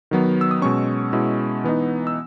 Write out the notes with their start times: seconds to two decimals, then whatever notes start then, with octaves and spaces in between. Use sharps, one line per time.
0.11 D#3 F#3 B3
0.41 E6
0.51 D#6
0.62 B2 G#3 C#4 C#6
1.13 B2 G#3 C#4 E4
1.64 E3 B3 D#4
2.07 E6